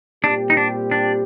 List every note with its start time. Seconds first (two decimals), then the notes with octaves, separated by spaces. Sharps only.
0.24 A#2 G3 C4 D4 G4
0.50 D#4
0.57 D4
0.91 D4